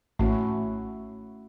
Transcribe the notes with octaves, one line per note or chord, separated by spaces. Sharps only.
A1 A3 C#4 E4 F#4